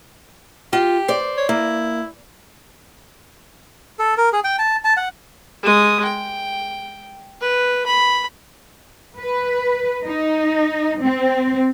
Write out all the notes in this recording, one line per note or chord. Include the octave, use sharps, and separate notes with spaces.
F4 G4
C5 D5
C#5
A#3 E4
A4
A#4
G#4
G5
A5
A5
F#5
G#3 D#6
G5
B4
B5
B4
D#4
C4